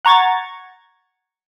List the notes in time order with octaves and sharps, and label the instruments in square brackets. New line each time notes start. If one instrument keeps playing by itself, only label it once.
[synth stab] F#5 A#5 C#6 G#6 A6